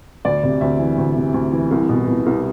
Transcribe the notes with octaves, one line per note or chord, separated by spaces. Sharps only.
D2 D5
C3
D2 E5
E3
D2
C3
D2
E3
C2
B2
B2
C2